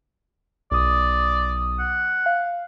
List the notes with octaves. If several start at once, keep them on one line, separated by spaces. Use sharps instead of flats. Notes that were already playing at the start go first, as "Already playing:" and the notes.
B1 D5 D#6
F#5
F5